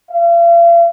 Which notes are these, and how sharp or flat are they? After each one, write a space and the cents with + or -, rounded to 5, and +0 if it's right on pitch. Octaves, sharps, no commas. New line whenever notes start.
F5 -45